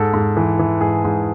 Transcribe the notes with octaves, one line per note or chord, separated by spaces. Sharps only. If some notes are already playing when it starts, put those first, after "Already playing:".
Already playing: G#2 A4
G#2
E3
E3
G#2 G#4
G#2